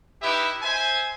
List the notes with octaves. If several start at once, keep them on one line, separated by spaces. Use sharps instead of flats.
D#4 E4 G4 B4 E5
C5 E5 G#5